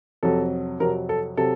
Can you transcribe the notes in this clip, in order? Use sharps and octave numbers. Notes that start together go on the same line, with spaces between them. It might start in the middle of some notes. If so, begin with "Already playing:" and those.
F2 C3 F#3 A4
F2 C3 F#3 A#4
A4
C3 F#3 A4